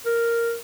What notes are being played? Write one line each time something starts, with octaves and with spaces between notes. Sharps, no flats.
A#4